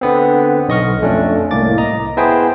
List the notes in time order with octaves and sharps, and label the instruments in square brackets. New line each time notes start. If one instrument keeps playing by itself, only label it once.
[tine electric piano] D3 B3 C4
B1 D#5 C#6 F6
F2 A3 C#4 D4
C2 A2 A#3 D6 A6
D#5 A#5
B3 E4 G#4 C5 G5 G#5